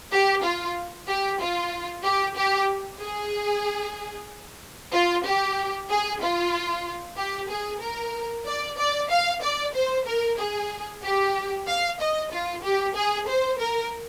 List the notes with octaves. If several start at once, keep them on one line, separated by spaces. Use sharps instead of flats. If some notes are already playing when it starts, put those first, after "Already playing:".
G4
F4
G4
F4
G4
G4
G#4
F4
G4
G#4
F4
G4
G#4
A#4
D5
D5
F5
D5
C5
A#4
G#4
G4
F5
D#5
F4
G4
G#4
C5
A#4